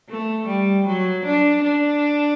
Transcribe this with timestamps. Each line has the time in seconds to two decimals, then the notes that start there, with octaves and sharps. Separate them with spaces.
0.10 A3
0.47 G3
0.87 F#3
1.25 D4
1.64 D4